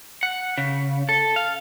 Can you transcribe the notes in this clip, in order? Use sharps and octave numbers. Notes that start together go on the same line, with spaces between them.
F#5
C#3
A4
F5